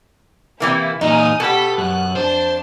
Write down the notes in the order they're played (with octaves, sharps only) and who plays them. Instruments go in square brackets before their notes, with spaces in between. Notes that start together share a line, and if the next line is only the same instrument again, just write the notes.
[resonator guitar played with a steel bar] C3 E3 A#3 [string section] E4
[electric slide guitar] E2 A#2 A#5 [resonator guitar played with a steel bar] D#4 [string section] G#5 D#6 F6
[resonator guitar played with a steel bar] B2 F#4 [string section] B3 G4 B6 [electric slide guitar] A4
[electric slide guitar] F#2 [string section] F#6
[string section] F2 D4 A5 [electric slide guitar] C5